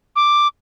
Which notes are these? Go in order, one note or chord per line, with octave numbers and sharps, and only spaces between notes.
D6